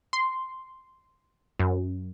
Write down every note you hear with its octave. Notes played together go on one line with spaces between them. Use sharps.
C6
F#2